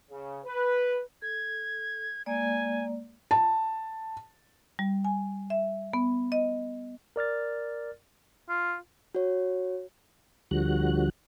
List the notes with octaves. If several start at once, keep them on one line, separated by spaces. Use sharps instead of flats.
C#3
B4
A4 G#6
G#3 A#3 D5 G#5
A5
G3
G#5
E5
B3
D#5
A#4 D5 F6 A6
F4
F#4 C#5
D2 D3 F3 G3 F#4 F#6